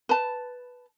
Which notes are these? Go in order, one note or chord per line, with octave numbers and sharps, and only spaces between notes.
B4 A5